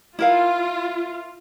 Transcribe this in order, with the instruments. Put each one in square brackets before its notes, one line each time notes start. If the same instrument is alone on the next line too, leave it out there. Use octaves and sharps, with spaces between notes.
[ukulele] E4 A#4 F5 [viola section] F4